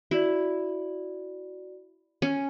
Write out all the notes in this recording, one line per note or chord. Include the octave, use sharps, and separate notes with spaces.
E4 F#4 D5
C#4